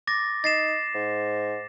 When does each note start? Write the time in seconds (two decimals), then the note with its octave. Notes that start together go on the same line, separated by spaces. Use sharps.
0.07 D6 A6 A#6
0.44 D#4 A6 C7 E7
0.95 G#2